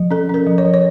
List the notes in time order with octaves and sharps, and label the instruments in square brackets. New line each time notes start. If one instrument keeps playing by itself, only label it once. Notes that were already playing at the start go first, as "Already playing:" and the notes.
Already playing: [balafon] F3
C#4 A4
C#4 A#4
F3
C#5
F3
C#5